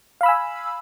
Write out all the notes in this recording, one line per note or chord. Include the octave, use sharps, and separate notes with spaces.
F5 G#5 B5 E6